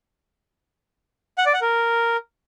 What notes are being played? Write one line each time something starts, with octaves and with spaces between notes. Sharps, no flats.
F#5
D5
F#5
A#4